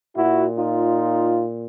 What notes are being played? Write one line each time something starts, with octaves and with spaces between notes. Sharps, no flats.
A#2 E4 F#4
D#4 F4